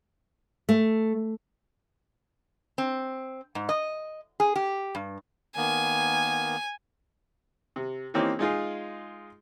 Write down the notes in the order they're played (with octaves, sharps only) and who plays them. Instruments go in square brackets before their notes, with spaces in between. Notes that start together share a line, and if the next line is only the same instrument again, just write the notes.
[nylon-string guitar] A3
[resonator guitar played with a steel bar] C4
G#2
D#5
G#4
G4
G2
[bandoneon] D#3 A#3 B3 [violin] G#5
[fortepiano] C3
E3 A#3 C4 C#4 D#4 G4
G#3 D#4 F4 G#4